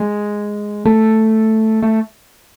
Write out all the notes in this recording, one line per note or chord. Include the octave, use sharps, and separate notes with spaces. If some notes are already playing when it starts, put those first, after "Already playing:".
Already playing: G#3
A3
A3